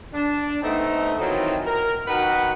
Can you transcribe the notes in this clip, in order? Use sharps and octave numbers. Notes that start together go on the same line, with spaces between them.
D4
A3 B3 C4 D#4
D#3 E3 F#3 C4 E4 F4
A#4
D#3 F#4 B4 F#5